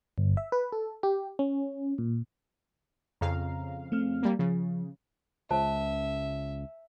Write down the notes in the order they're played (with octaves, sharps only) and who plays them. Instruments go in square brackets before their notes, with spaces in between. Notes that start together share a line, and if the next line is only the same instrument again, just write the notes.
[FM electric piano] G1
E5
B4
A4
G4
C#4
A#2
[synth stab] F2 C#3 F5 [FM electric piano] A#5
[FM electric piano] A3 C4 F6
[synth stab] G3 A#3
[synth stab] C#3 [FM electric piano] F3
[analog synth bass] C#2 [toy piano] C5 A5 [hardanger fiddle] E5